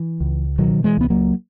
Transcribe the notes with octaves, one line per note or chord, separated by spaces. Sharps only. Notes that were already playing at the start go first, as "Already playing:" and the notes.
Already playing: E3
C#2
B2 D#3 F#3
E3 G#3
C#2 B3
F#3 A#3